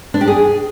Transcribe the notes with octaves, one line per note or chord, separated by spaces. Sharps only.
D4
G4
G#4